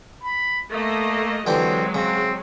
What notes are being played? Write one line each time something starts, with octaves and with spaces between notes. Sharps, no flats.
B5
A3 A#3 D#5
D3 E3 F#3 G#3 C4 G4
C#3 C4